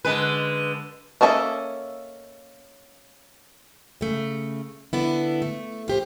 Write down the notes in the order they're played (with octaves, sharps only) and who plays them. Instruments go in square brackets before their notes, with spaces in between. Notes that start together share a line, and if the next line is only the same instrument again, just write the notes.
[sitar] D3 G#3 B4
[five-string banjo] A#3 C#4 A4 D#5 E5
[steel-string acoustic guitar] C#3 A3
D3 B3 E4
A3
F4 G4 C5